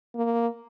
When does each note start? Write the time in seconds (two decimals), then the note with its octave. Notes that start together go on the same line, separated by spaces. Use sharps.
0.15 A#3